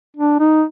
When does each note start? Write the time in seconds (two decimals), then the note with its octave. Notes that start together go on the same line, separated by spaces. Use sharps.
0.17 D4
0.40 D#4